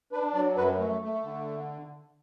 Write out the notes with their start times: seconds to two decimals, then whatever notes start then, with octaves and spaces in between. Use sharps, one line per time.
0.12 D4 B4
0.34 F#3 D5
0.57 F#2 B4
0.78 A3
1.02 A3
1.23 D3